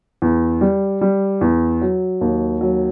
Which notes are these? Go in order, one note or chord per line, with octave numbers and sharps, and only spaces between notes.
E2
G3
G3
E2
F#3
D#2
F#3